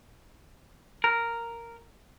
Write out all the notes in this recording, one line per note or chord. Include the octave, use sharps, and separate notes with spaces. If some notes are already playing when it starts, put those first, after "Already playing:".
A#4